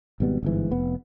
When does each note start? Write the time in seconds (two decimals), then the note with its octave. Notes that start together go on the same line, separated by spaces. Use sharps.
0.20 G#1 B2 G3 B3
0.43 G1 G#2 E3
0.71 F1 B3